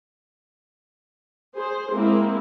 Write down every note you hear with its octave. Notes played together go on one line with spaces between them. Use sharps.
G#4 C5
G#3 A#3 C4 E4